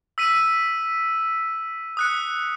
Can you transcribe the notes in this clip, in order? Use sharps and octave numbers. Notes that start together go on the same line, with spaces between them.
E6 B6 D#7
D#6 F#6 C#7